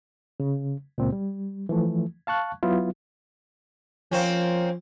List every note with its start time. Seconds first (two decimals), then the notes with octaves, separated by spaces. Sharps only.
0.40 C#3
0.98 C#2 A#2 C4
1.12 G3
1.69 E3 F3 A3
2.27 F5 A5 C#6 F#6
2.63 F#3 B3 E4 F4
4.11 F3 A#3 C4 C#4